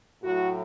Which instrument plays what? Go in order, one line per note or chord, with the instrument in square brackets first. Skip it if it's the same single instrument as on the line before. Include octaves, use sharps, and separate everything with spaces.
[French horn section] A2 F#3 F#4